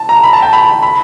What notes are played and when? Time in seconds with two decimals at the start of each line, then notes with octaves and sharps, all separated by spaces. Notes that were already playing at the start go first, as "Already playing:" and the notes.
Already playing: A5
0.09 A#5
0.23 B5
0.33 A5
0.42 G5
0.53 B5
0.83 B5